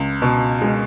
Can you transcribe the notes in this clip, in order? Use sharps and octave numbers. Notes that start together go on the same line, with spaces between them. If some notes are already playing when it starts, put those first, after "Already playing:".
Already playing: C#2
B2
G#3